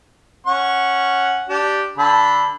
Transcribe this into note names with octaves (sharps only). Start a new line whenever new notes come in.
C#4 F#5 C#6
D4 G4
D3 A4 B5